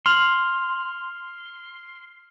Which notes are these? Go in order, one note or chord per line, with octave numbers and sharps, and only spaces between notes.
C6 F6 F7 F#7